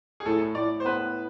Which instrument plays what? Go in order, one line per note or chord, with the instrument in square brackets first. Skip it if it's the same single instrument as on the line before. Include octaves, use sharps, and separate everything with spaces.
[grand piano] G#4
[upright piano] A2 [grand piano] A4
[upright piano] A2 [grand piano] D5
[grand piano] C5
[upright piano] B3 [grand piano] B4